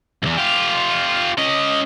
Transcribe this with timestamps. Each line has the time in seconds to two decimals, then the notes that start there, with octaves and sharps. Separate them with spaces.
0.23 B1 E2
0.37 F4 G4
1.38 C#4 D#5